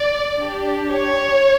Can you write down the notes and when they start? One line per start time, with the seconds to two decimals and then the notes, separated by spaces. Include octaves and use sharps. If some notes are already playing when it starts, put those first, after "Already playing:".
Already playing: D5
0.38 D4 G4
0.91 C#5